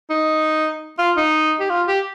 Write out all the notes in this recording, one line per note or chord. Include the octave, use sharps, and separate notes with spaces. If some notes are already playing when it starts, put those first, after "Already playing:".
D#4
F4
D#4
G4
F4
G4